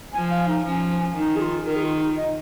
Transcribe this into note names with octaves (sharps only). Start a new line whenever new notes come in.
F3 G#5
F5
D#4
F3 C#4
D#3 D#4
G#4
F4
D#3 A#4
G#4
F4
D#4
D#5